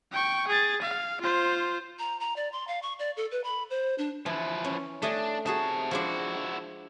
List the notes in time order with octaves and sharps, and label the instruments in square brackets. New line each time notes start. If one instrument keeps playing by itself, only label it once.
[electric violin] G5 C#6
G#4 A6
F5
F4 C5
[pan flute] A#5
A#5
D5
C6
F5
C#6
D5
A4
B4
B5
C5
D4
[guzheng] E3 [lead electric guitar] F3 B4
[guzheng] C#4
[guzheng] A3 D#5 G#5 [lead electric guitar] D4
[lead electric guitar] C3 A5 [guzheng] D#4 F#4 G#4
[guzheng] F3 G#3 D4 [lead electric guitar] E4 F#4